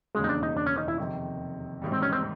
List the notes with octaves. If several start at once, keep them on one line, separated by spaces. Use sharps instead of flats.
E1 D#2 C#3 G#3
D#4
D4
D#4
D4
C#4
D#4
E4
F2 C3 D#3
A1 G#2 D#3 G3
C4
C#4
C4